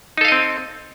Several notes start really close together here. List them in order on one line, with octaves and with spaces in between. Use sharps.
D#4 A4 F5 D#5 C4